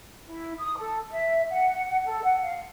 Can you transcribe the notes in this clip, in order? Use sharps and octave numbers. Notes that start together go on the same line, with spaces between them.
E4
D#6
A4
E5
F#5
A4
F#5
F5